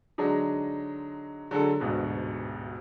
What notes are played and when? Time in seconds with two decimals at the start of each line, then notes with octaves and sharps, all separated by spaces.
0.18 D3 F#3 G#3 D4 D#4
1.51 D3 F#3 G#3 A4
1.80 A1 D2 G#2 B2 D3